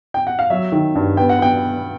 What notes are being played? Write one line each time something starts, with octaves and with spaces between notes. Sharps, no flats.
G5
F#5
F5
F#3 E5
D#3
G2
B3 G5
F#5
B3 G5